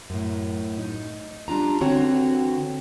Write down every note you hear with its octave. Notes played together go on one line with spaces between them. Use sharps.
F#2 A2
D#4
G3 D4 F4 A#5
D3 E3 C4 F#4 C#5